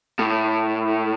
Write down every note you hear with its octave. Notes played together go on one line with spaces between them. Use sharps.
A2